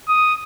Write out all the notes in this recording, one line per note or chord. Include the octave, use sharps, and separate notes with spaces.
D#6